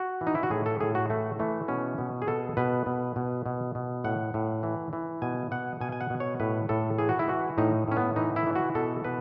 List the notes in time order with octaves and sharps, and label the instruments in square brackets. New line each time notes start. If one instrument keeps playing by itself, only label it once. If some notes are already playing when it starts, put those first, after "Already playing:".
Already playing: [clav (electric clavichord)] F#4
E3
D#4
E4
F#4
A2 G#4
A4
A2 G#4
F#4
E3 A3
E3 A3
B2 C#4
B2
G#4
B2 A4
B2 B4
B2
B2
B2
B2
A2 F#5
A2
E3
E3
B2 G#5
B2 F#5
B2 G#5
G#5
F#5
B2
C#5
A2 B4
A2 A4
E3 G#4
F#4
E4
E3 F#4
A2 D#4
A2 C#4
B3
E3 D#4
E4
E3
F#4
B2 A4
B2 B4